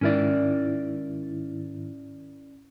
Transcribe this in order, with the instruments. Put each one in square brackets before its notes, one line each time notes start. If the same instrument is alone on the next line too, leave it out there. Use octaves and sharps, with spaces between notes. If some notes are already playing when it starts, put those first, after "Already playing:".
[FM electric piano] G#2 D#3 E4 [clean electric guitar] C#4 A#4 D5